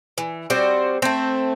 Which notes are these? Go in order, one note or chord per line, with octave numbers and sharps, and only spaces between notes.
E3
G3 C4 F#4 C5
A3 C4